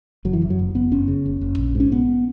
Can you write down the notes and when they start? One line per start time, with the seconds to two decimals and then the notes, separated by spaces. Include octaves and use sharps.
0.25 F#1 F#3
0.33 E3
0.42 F#2
0.50 F#3
0.59 F#1
0.75 F#1 B3
0.91 F#1 C#4
1.08 C#3
1.26 F#1
1.41 F#1
1.58 A#1
1.75 G#2
1.80 C#4
1.91 A#1 B3